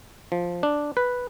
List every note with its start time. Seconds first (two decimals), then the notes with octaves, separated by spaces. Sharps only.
0.32 F3
0.63 D4
0.97 B4